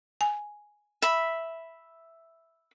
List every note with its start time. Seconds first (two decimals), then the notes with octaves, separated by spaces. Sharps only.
0.21 G#5
1.02 E5 B5